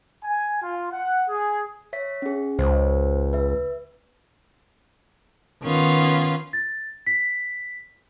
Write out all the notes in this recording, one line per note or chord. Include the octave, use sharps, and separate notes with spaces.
G#5
F4
F#5
G#4
C#5 E5 B6
C#4 G#4
C#2 C5
B4 E5
D#3 B3 C#4 F4
A6
B6